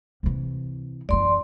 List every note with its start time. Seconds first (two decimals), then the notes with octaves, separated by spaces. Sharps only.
0.23 C3 E3
1.09 F#2 E3 D5 C6